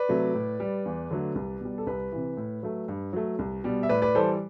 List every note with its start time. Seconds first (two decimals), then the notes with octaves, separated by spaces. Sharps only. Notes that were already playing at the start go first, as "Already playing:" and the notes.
Already playing: B4 D5
0.09 C3 F#3 A3
0.35 A2
0.60 G3
0.85 E2
1.11 D3 F#3 A3
1.35 C2
1.61 B2 G3
1.78 A4
1.87 C2 B4
2.12 C3 E3
2.37 A2
2.63 F#3 A3
2.88 G2
3.13 F#3 A3
3.39 C2
3.64 B2 G3
3.83 E5
3.89 A2 B4 D5
4.02 B4 D5
4.15 E3 G3 A4 C5